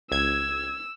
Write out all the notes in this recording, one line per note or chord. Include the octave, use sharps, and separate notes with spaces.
C#2 E6 G#6